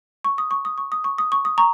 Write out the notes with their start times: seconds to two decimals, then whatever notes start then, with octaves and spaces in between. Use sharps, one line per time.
0.24 C#6
0.38 D#6
0.51 C#6
0.65 D#6
0.78 C#6
0.92 D#6
1.04 C#6
1.18 D#6
1.32 C#6
1.45 D#6
1.58 A#5 C#6